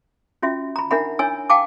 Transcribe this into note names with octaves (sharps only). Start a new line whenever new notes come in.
C#4 F4 F#4 E5
A#5 B5
D4 D#4 A#4 E5 F#5 B5
D4 E4 C#5 G#5 E6
F5 G5 A5 D6